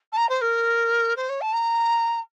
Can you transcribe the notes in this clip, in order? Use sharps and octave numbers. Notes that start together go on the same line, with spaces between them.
A5
A#5
C5
A#4
C5
C#5
A5
A#5